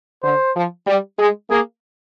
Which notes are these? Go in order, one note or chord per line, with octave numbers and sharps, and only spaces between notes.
D3 C5
F3
G3
G#3 G#4
A#3 G#4